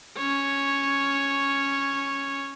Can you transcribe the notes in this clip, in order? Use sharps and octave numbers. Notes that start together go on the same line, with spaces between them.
C#4 C#5